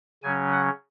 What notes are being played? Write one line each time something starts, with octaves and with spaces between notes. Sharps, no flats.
C#3 F#3 C#4 G#5
F#5